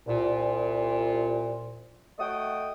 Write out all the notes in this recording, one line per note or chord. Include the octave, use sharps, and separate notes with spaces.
C2 A#2
A3 F#4 D#5 G5 D#6